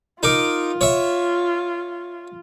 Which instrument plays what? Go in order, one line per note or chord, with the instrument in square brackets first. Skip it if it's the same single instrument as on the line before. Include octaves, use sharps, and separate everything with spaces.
[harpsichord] D#4 A#4 D6 [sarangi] F4
[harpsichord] C#5 E5